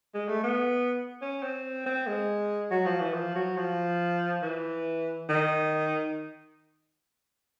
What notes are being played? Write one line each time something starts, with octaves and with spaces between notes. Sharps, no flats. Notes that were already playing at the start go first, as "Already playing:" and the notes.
G#3
A3
B3
C#4
C4
C4
G#3
F#3
F3
E3
F3
F#3
F3
E3
D#3